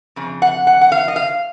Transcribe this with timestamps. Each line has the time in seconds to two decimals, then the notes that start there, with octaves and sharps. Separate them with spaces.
0.16 F2 C#3
0.42 F#5
0.67 F#5
0.81 F#5
0.92 F5
1.08 D#5
1.16 F5